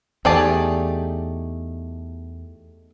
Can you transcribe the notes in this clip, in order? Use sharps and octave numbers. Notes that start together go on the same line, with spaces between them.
E2 A3 D#4 G4 G#4 D5 A5